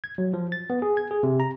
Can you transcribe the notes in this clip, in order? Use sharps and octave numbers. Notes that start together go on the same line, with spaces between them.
G#6
F#3
F3
A6
B3
G#4
G#6
G#4
C3
A#5